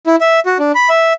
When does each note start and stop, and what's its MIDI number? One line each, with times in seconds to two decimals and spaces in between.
0.07 0.16 64
0.21 0.40 76
0.46 0.58 66
0.59 0.72 62
0.75 0.89 83
0.89 1.13 76